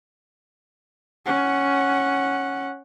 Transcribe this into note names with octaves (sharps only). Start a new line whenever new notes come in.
C#4 F#5